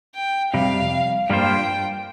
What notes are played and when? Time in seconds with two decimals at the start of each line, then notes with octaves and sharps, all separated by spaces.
0.15 G5
0.53 F2 C3 G3 F5
1.30 G2 G3 A#3 F4 C5 G5